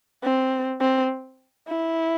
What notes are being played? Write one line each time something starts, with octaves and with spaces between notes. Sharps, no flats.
C4
C4
E4